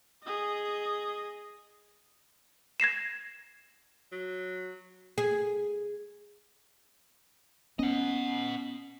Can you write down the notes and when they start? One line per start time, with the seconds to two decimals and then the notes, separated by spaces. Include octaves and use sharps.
0.23 G#4 D#5
2.80 G#6 A#6 C7 E7
4.12 F#3
5.18 G#4
7.79 B3 C#4 D#5 F#5